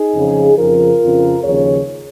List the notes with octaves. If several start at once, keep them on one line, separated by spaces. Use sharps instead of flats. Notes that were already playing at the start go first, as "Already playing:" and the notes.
Already playing: D#4 G#4
F2 C#3 F3
F2 C#3 F3 F4 A#4
F2 C#3 F3
D#2 C#3 F3 G#4 C#5